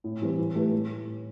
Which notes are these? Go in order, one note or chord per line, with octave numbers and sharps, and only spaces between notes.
A2
E3 G3 C4
E3
A3 E4 G4 B4
A2